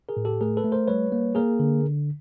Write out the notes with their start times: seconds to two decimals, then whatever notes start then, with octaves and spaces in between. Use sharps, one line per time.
0.09 G#4 A#4
0.17 A2
0.25 G4 A4
0.41 A3 G#4 A#4
0.57 A4 B4
0.64 A3
0.72 A#4 C5
0.88 G3 B4 C#5
1.12 A#3
1.35 A#3 G#4 A#4
1.60 D3